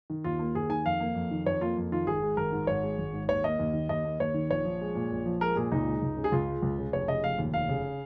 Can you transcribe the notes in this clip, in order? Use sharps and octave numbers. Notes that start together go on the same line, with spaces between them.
D#3
D#2 F4
A#3
D#2 G#4
D#3 G#5
F2 F5
A#3
F2
D#3
F2 C#5
A#3 F4
F2
D#3 F4
G#1 G#4
G#3
G#1 A#4
G#2
G#1 C#5
G#3
G#1
G#2
D#2 C#5
A#3 D#5
D#2
D#3
D#2 D#5
A#3
D#2 C#5
D#3
A#1 C#5
F3
G#3
A#2
A#1
F3
G#3 A#4
A#2 G#4
C#2 D#4
G#3
C#2
C#3
G#4
C#2 F4
G#3
C#2
C#3
F1 C#5
C#3 D#5
F1 F5
D#2
F1 F5
C#3